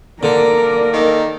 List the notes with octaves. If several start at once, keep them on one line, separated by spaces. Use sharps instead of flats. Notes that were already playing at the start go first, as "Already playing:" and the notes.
D3 A#3 A#4 D5
D#3 D#4 A4